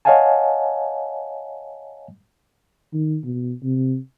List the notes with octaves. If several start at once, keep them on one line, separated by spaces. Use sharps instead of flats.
C#5 D#5 F5 F#5 G#5 A5
D#3
B2
C3